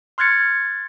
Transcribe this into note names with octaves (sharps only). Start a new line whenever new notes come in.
C6 F6 F#6 G#6 A6 C#7